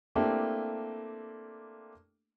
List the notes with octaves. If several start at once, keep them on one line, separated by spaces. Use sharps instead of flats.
A3 A#3 C4 D4 E4 G4